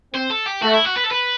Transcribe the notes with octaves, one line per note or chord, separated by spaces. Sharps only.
C4 C5
A4
G4
A3 F#4
E4
F#4
B4
A4
B4